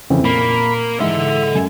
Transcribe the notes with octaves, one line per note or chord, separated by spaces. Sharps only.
F2 C#3 E3 C4
A#2 A#3 B5
G#2 E3 A4 E5 F#5
F#2 G#5